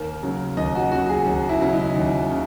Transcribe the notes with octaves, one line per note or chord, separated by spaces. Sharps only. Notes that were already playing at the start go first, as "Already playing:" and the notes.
Already playing: D#2 A#4
C#3 F#3
D#2 D#5
F#4
C#3 F#3 F#4
G#4
D#2
E4
C#3 F#3 E4
D#4
D#2
C#3